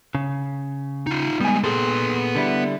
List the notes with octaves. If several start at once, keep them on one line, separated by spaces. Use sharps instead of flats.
C#3
D#4 F4
G3 G#3 B3 G#5
A#2 B3 G#4 A4 C6
D3 G3 E4